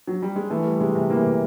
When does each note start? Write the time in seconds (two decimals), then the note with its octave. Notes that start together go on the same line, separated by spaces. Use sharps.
0.07 F#3
0.22 G3
0.36 G#3
0.50 E3 A3
0.65 G3
0.80 C3 G#3
0.95 C3
1.10 E3 A#3
1.25 C3